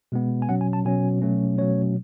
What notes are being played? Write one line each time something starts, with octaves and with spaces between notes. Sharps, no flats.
B2 G#3 B3
G#5
B2 F#3 C#4 F#5
G#5
A5
B2 F#3 C#4 G#5
B2 F#3 A3 C#4
B2 F#3 A3 C#4 C#5